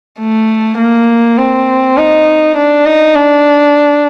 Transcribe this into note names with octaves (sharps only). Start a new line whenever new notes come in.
A3
A#3
C4
D#4
D4
D#4
D4